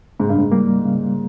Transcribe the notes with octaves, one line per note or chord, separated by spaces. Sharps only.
G#2 C#3
G2
G#2
G3 A#3
C#3